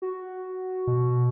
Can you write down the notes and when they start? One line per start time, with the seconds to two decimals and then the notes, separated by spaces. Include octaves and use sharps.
0.02 F#4
0.87 B2